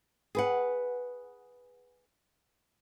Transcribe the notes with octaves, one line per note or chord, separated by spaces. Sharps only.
G#4 B4 F#5